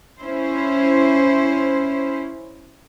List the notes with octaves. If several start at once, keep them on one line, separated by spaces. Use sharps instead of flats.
C#4 E4 C5